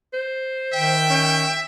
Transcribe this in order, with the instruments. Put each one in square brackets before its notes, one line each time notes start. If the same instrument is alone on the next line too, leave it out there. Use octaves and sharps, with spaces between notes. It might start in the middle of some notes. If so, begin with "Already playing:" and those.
[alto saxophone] C5
[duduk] D#3 [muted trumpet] E5 [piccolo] G5
[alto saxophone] C#4